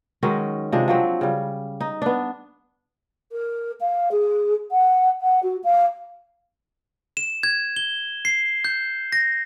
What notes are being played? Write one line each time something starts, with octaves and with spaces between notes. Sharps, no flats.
D#3 F#3 G#3 C#4
C3 F3 G#3 D4
F3 F#3 C4
C#3 G3
D#4
B3 D4
A#4
F5
G#4
F#5
F#5
F#4
F5
E7
G#6
G7
C7
G6
A#6